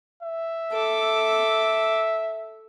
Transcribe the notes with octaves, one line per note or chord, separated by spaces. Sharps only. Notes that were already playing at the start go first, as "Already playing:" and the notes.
E5
A4 D6